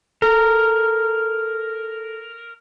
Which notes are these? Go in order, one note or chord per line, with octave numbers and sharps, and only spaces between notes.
A4 A#4